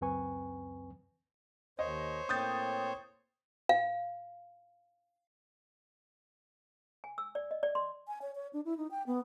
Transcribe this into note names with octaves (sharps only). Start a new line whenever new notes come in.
C#2 F#2 C4 B4 G#5 C#6
D#2 C5 C#5 D#5
A2 A#3 C4 D#6 G6 A6
F5
G#5
E6
D5
D#5
D5
C6
G#5
C#5
C#5
D4
E4
D#4
G5
B3